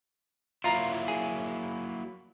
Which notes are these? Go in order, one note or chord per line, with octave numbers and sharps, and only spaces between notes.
F#3 A#3 E4 F4 A#5
G#4